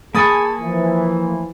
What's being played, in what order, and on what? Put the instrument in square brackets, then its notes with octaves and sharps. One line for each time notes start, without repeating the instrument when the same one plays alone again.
[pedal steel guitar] A#3 G#5 C#6 [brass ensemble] G#4 A5 [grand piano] B5 D#6 A6
[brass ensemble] E3 F3